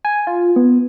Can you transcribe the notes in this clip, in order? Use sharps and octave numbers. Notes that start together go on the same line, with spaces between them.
G#5
F4
B3